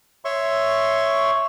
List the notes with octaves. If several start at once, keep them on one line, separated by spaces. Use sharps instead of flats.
C#5 E5 C6 C#6